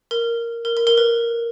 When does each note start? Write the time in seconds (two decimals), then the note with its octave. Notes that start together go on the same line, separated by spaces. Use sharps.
0.11 A#4
0.65 A#4
0.77 A#4
0.87 A#4
0.98 B4